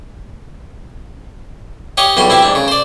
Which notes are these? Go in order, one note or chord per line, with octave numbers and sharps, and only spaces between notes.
G4 C#5 D#5 F5
B1 E2 G3 C6
C4 E4 G4
G#2 D4
C#3
C5 D5